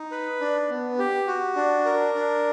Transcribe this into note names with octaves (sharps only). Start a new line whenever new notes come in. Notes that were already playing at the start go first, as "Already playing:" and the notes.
Already playing: D#4
B4
D4
B3
G4
F#4
D4
A#4
D4